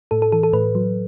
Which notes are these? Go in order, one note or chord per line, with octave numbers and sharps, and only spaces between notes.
A2 A4
A4
E3 A4
A4
A2 B4
F#3